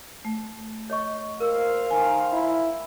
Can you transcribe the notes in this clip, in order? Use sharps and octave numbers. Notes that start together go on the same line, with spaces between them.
A3
C#5 D#5 C#6
A#2 A#4 C5 F5 E6
D#3 G#5
E4